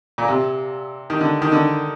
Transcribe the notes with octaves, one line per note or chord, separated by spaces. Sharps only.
A#2
C3
D#3
D3
D#3
D3